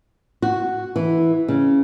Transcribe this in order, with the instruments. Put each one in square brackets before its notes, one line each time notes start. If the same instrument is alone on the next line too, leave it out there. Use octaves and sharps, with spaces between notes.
[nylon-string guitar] F#4
E3
C#3